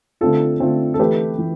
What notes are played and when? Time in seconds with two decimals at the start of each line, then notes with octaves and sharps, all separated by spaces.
0.21 D3 A3 C4 F4 A4
0.60 D3 A3 C4 F4
0.94 A4
0.99 E3 A3 E4 G4 B4
1.38 E3 A3